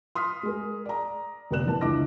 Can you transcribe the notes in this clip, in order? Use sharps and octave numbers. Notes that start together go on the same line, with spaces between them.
C6 D#6 F6 B6
G#3 G#4 A#4
D5 A#5
G1 C3 A#4 D5 F#6 E7
A2 E3 A5
C#2 D3 E4 D#5 D6 A#6